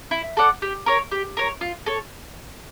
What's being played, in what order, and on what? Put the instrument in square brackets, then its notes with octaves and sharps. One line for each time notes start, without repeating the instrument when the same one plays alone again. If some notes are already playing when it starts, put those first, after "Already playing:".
[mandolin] E4
A4 D5 F#5
G4
A#4 C#5
G4
A#4 C#5
F4
A4 C#5